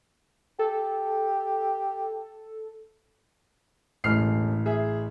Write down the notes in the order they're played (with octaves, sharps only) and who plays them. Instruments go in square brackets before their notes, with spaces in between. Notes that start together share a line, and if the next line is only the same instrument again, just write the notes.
[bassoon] G4 [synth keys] A4
[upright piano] E1 F6 C7 [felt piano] A1
[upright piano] G#4 E5